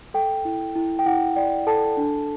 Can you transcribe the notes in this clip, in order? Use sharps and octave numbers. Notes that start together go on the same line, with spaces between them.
A4 G5
E4
E4
G5
E4 F#5
D5 G5
A4 A5
D4